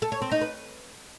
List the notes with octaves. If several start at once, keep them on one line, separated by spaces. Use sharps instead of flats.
A4
C#5
C4
D#4
B4